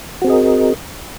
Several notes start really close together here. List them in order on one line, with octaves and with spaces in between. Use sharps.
F#4 C4 G#4 D#5 A#4